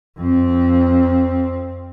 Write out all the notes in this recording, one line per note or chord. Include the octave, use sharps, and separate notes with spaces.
F2 C4